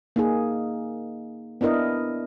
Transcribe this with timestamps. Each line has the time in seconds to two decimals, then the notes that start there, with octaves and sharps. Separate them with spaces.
0.16 A#3 D#4 G#4
1.61 B3 D4 E4 A#4 D#5